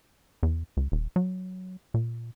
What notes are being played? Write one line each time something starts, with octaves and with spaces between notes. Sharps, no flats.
E2
C#2
D#1
F#3
A#2